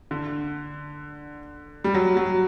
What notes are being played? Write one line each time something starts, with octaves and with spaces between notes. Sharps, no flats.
D3
G3
F#3
F#3